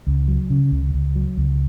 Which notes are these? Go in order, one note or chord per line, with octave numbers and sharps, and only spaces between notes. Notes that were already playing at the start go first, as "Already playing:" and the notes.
C#2
F#3
C#3
C#2
C#2
F#3
C#2